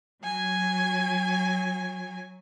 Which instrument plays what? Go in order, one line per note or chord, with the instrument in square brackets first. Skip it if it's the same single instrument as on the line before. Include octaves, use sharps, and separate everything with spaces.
[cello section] F#3 [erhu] G#5